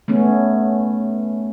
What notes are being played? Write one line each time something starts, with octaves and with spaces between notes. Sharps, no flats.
A3 B3 C#4